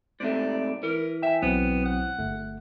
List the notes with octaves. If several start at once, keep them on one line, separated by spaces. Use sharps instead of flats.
G#2 C3 A3 D5
E3 A#4
E5 G5 G#5
B1 F#3 B3 C4
F#5
G1 A3